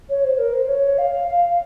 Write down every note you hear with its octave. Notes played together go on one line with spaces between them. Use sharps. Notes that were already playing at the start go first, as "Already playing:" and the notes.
C#5
C5
A#4
C5
C#5
F5
F5